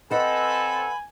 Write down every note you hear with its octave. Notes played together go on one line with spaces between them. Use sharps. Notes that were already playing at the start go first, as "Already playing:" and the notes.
C4 A4 B4 D#5 F#5 G#5 B5